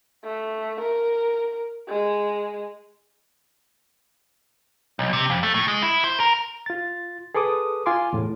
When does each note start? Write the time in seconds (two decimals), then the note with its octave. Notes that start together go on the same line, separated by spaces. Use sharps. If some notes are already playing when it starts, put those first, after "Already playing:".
0.24 A3
0.81 A#4
1.89 G#3
4.99 B1
5.13 C3
5.30 F2
5.43 A3
5.54 A2
5.68 G#3
5.82 E4
6.04 C5
6.20 A#4
6.66 F4 A6
7.34 G#4 A4 B4 D6 D#6
7.86 F4 G#5 C6 D6
8.13 E2 A2